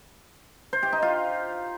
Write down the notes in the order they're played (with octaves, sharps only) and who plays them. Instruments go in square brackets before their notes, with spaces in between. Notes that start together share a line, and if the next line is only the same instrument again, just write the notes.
[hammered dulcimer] C5
G4
D#4
F4